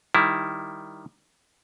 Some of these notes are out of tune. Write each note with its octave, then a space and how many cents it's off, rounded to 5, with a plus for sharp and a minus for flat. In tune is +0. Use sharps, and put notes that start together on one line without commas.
D#3 +0 G3 +10 E4 +0